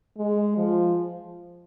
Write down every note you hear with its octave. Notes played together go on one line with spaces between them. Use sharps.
G#3
F3